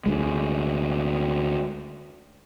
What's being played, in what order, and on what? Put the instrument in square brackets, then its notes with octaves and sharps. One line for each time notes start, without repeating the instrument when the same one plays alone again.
[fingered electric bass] D2 G#3